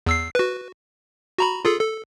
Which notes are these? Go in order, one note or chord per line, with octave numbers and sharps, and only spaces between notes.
E2 E6 C7
F#4 B4
F#4 A#5 B5
F4 G#4 A4
A4